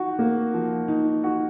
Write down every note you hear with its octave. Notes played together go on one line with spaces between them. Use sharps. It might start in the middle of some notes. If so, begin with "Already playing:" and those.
Already playing: F3 D#4 F#4
A#3
F3
D#4
F#4